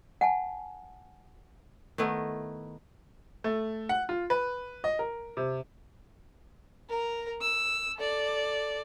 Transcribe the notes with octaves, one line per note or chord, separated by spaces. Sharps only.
F#5 G#5 A5
D#3 A3 B3 E4
A3
F#5
F4
B4
D#5
A#4
C3
A#4 A#5
E6
A4 D5